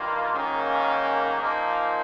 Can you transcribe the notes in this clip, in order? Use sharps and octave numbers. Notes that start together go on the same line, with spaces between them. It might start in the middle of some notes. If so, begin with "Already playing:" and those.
Already playing: G2 D#3 A#3 F4
G#2 D#3 A#3 C#4
A#2 F3 A#3 D#4